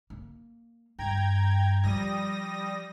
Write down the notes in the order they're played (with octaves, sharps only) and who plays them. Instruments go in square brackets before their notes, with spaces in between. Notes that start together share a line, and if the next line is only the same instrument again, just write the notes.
[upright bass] A#3
[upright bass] G2 [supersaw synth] G5 A#5 G#6
[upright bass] F3 [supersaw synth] G3 D#6 A#6